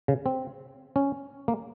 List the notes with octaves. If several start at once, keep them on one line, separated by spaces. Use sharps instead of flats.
C#3
C4
C#4
A#3